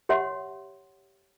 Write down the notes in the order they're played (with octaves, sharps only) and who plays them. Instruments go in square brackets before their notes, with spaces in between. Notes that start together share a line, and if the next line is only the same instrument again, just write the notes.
[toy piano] G4 C#5 E5 F#5 C6